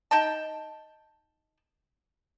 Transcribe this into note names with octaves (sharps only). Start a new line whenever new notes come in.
D#4 G5 A5